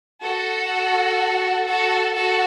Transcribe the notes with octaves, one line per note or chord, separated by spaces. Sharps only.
F#4 A4
F#4 A4
F#4 A4